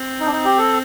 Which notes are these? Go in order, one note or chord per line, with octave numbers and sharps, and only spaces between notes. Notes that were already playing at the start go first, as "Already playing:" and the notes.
Already playing: C4
D#4
D4
D#4
G4
A4